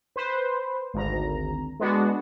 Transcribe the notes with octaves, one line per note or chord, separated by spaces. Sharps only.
B4 C5
G#1 D2 A#5
G#3 B3 D4 F#4